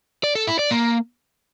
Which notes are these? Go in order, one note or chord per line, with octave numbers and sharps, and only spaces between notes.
D5
A4
E4
D5
A#3